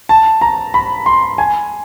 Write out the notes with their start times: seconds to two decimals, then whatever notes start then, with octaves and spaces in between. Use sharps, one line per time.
0.09 A5
0.41 A#5
0.74 B5
1.06 C6
1.38 G#5